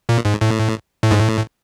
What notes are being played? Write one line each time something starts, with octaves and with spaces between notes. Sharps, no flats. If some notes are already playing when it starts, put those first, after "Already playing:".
A#2
G#2
A2
A2
G#2
A2